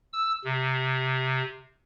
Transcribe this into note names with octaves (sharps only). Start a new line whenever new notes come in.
E6
C3